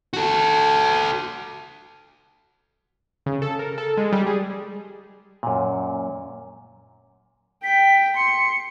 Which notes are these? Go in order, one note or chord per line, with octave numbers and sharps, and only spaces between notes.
F#4 A4
C#3
A4
A#4
A4
G#3
G3
G#4
F#2 A#2
G5 B6
C6 C#7